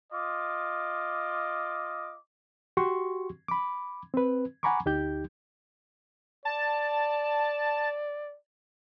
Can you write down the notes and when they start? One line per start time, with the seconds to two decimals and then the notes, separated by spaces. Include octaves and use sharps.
0.13 F4 D#5 D6
2.77 F#4 G4 C6 C#6
3.48 B5 D6
4.14 C4 B4
4.63 F#5 G#5 A#5 B5 C#6 D6
4.86 D2 D#4 G4 G6
6.45 D5 A5